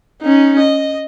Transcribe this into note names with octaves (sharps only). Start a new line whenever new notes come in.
C#4 D#4
D#5